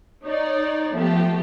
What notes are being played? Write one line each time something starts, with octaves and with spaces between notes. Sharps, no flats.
D#4 C#5 D5
F3 A3 B3 G4